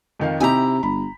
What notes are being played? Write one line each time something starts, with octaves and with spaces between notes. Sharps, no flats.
F2 D#3 F5
C3 D#4 E4 G4 G#5 A#5
G1 B5